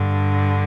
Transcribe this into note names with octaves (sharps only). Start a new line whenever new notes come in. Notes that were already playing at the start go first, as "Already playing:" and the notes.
Already playing: G2 D3